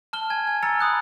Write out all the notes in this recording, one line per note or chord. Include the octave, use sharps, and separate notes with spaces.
A5 F6 G7
G#5 G#6
G#5
G#5 A#5 E6 F6 A6 C#7
B5 D#6 F#6 C#7